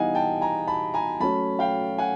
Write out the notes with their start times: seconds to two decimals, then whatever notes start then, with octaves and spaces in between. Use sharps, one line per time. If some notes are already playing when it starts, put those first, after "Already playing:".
Already playing: E3 G3 B3 D#4 D#5 F5 F#5 G#5
0.15 G5 A5
0.41 G#5 A#5
0.67 A5 B5
0.94 G#5 A#5
1.20 F#3 A3 C#4 A5 B5
1.59 F5 G5
1.98 F#5 G#5